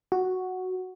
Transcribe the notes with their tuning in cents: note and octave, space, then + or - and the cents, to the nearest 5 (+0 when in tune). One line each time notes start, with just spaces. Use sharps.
F#4 +0